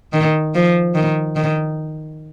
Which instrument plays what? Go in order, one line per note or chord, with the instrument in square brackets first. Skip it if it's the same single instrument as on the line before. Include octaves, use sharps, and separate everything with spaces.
[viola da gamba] D#3
F3
D#3
D#3